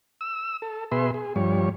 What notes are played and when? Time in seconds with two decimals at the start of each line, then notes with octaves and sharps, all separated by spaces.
0.21 E6
0.62 A4
0.92 B2 G#4 B4 E5 C6
1.14 G#4
1.36 G2 F3 G3 C#5